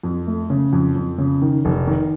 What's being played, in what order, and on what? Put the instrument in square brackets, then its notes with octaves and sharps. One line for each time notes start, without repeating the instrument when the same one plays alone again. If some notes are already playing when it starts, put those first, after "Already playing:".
[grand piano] F2
A3
C#3
F2
F2
C#3
D#3
F1
D#3